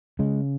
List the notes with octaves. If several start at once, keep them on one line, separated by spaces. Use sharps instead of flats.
C#3 G#3